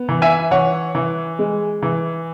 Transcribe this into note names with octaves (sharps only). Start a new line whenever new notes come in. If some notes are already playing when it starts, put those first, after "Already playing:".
Already playing: B3
E3
E5 G#5
E3 C#5 F#5
E3
G#3
E3